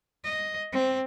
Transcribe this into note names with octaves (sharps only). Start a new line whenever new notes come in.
D#5
C4